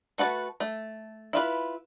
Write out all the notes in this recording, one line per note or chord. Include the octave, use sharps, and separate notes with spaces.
A3 F#4 B4 A5
A3
E4 F4 B4